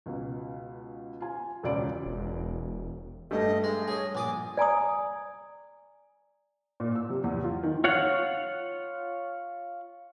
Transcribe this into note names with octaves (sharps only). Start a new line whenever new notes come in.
C#2 B2
F4 G#5
E1 C#2 F4 D5 D7
E1
G2 A3 D#5
G#3 G#4
G#4 C#5 D#5
A#1 D5 G#5 D#6
D5 G#5 A#5 D#6
A#2
E6
C3
E2
F4
D#3
F4 C#5 F5 F#5